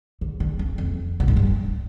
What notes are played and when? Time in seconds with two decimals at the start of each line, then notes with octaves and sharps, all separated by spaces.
0.21 D3
0.40 D3
0.59 F2
0.78 F2
1.20 B2
1.28 G#2
1.37 G2